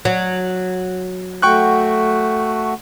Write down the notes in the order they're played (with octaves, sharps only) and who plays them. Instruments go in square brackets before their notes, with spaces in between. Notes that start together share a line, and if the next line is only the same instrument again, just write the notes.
[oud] F#3
[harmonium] A3 F#4 [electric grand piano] G5 C#6 F#6